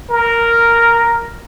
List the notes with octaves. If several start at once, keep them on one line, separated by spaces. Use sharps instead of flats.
A#4